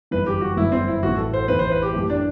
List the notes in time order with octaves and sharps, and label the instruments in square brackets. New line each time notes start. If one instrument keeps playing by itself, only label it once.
[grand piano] G1 F#2 E3 [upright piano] B4
[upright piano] G4
F#4
[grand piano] G1 F#2 E3 [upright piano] E4
[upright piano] C4
E4
[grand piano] A1 A2 E3 [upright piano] F#4
[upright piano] A4
C5
[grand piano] A1 A2 E3 [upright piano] B4
[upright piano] C5
B4
G4
[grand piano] F#2 E3 A3 [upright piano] G4
[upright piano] D4